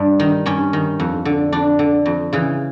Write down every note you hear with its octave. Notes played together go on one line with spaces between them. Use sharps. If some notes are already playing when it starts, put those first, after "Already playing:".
Already playing: G2 D4
D#3
G2 C#4
D#3
F2
D3
F2 D4
D3
F2
C#3 E3